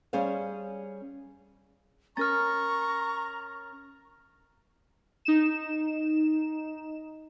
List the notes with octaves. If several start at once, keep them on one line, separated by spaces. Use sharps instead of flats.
G3 C#4 G#4 C5 C#5 F5
C#4 A#4 A#5 C#6 F6 A6
D#4 E7